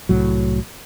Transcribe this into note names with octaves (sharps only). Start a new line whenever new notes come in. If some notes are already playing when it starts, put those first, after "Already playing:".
C2 A2 F#3